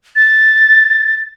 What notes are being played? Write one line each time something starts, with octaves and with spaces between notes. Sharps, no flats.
A6